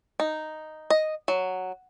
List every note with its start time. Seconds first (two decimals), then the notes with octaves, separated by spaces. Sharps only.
0.20 D#4
0.90 D#5
1.28 F#3